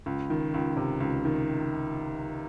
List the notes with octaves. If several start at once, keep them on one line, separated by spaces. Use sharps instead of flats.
C#2
D#3
C#2
C3
C#2
D#3